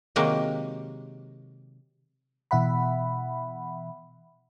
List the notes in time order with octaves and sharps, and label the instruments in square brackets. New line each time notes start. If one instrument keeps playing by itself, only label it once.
[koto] C3 D#3 F#3 G#3 A#3 G4
[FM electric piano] B2 E3 E5 F#5 B5